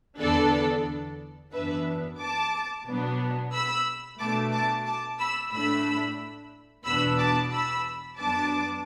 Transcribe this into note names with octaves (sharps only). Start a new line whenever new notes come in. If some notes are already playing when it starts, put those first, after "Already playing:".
E2 D3 B3 D4 A4 D5
F#2 E3 B3 D4 B4 E5
A5 D6
B2 F#3 B3 D4
B5 E6
B2 A3 D4 A5 D6
A5 D6
A5 D6
B5 E6
A2 A3 D4 B5 E6
E2 B2 B3 D4 B5 E6
A5 D6
B5 E6
F#2 F#3 B3 D4 A5 D6